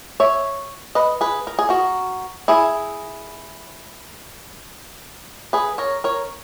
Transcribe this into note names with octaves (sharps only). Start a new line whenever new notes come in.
C#5 E5
B4 D#5
G#4 B4
A#4
G#4
F#4 A#4
E4 G#4
G#4 B4
A#4 C#5
A#4 C#5